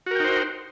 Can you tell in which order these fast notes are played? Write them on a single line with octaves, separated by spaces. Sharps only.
F#4 A#4 G5 D#4 C5